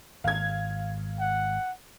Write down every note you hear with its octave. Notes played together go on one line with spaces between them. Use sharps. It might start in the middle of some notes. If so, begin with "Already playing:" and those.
G#1 F5 G#6
F#5